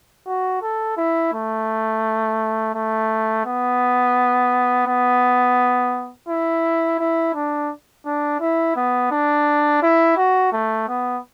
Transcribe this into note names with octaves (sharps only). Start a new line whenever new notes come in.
F#4
A4
E4
A3
A3
B3
B3
E4
E4
D4
D4
E4
B3
D4
E4
F#4
A3
B3